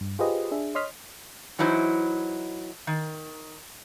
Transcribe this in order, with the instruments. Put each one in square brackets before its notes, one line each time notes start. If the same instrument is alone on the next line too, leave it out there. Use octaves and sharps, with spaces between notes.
[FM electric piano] G2
F4 G4 G#4 B4 C5 D#5
D4 G#4 E5
C#5 D#5 C6 D#6 F6 B6
[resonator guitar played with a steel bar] E3 F#3 D#4 E4 C5
D#3